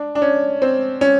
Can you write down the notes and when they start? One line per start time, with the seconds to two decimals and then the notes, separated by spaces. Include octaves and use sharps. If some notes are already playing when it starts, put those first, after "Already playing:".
Already playing: D4
0.15 D4
0.22 C#4
0.62 C4
1.01 C#4